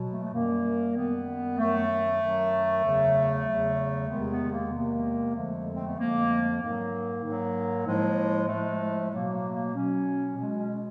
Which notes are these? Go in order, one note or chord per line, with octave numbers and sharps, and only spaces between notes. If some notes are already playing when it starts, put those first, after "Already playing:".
Already playing: B2 F#3
A3
A3
F#2 D#3 G3 A#3
F#2 D#3 G3 B3
F#2 D#3 F#3 A3
F#2 D#3 F#3
E2 C#3 F#3
E2 C#3 F#3
E2 C3 D#3 G#3 B3
B3
A#3
E2 C3 D#3 G#3 A#3
F2 D3 F3 G#3 A3
C4
B3
F2 D3 F3 G#3 A#3
G#2 D#3 F#3 A#3
G#2 D#3 F#3
A2 F3 G#3
A2 F3 G#3 A3
B2 F#3 A#3
A#3
A#3
B2 F#3 C#4
B2 G#3 C#4
C#4